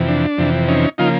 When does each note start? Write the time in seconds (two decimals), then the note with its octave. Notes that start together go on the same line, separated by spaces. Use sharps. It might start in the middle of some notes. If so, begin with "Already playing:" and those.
Already playing: F2 C3 E3
0.08 D4
0.38 F2 C3 E3
0.68 C#4 D#4
0.98 C#3 F3 A#3 D#4 F4